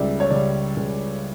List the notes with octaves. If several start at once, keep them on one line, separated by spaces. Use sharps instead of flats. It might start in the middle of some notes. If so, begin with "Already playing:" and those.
Already playing: C#2 C#3 G3 D5 E5
C#5
C#3 G3 D5
C#2